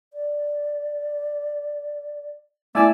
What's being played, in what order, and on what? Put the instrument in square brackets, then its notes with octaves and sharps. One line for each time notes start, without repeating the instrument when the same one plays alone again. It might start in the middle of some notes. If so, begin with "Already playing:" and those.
[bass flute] D5
[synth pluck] A3 E4 [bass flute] B3 [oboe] D5 [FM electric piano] E5 G#5 E6